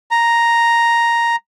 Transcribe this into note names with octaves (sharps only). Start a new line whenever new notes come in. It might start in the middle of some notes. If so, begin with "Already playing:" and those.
A#5